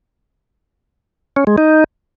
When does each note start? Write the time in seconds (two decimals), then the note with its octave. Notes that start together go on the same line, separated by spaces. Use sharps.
1.36 C#4
1.47 G#3
1.58 D#4